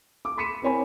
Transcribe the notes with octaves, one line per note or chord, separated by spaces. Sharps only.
D6
B5 C6 B6 C#7 D#7 E7
C4 E4 A#4 C#5 G#5 B5